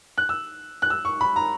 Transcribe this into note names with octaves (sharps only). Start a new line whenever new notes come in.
F#6
E6
F#6
E6
C#6
B5
A#5